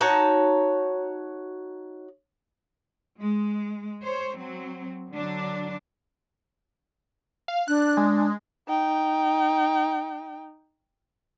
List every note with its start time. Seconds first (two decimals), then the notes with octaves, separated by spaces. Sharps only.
0.01 D#4 F#4 C#5 A5
3.19 G#3
4.04 C5 C#5
4.38 F#3 C4
5.11 D3 F#3 D4
7.48 F5
7.68 D4 F#6
7.97 G#3
8.68 D#4 G5